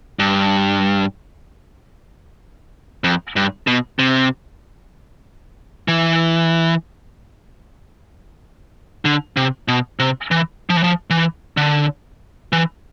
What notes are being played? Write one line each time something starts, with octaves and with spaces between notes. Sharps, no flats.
G2
F2
G2
B2
C3
E3
D3
C3
B2
C3
E3
F3
E3
F3
E3
D3
E3